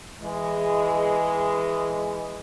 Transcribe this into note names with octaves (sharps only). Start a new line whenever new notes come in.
E3 G#3